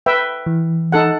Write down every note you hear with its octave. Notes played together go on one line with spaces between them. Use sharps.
B4 E5 G5
E3
D#4 A4 F#5